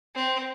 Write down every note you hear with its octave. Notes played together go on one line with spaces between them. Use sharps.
C4